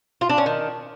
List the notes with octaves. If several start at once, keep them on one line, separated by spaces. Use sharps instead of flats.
F4
D4
C#4
D#3